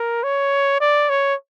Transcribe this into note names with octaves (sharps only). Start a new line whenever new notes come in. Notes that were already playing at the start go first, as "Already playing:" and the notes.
Already playing: A#4
C#5
D5
C#5